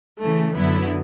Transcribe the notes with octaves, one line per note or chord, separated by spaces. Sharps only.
C#3 E3 A3
F#2 D3 F#3 B3 E4